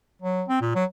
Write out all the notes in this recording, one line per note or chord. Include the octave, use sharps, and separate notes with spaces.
F#3
C4
A#2
F#3